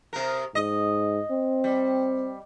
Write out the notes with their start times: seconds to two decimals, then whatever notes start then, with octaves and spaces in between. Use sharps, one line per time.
0.13 C3 A#4
0.55 G#2 D#5
1.31 C4
1.64 G3